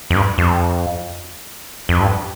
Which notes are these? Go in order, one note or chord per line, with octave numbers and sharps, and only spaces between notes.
F2
G2
F2
F2
G2